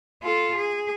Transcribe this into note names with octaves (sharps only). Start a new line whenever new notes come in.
F4 A4
G#4